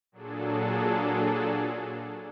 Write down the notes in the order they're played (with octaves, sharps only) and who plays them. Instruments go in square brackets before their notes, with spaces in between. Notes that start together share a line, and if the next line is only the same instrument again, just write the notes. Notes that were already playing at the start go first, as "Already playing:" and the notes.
[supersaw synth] A#2 F#3 D4 G#4 A4